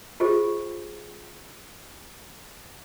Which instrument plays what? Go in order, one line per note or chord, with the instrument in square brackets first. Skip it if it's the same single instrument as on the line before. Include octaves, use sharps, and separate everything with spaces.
[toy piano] F4 G4 G#4 C5 D#5